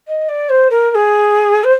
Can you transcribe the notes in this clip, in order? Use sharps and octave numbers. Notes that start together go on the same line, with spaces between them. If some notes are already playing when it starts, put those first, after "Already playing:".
D#5
D5
C5
A#4
A#4
G#4
C5